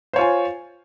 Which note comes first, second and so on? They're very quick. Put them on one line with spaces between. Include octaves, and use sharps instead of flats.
C5 C#5 F4 G#5